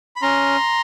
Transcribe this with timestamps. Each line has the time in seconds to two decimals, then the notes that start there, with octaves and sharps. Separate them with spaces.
0.16 B5
0.22 C#4 A#5 C6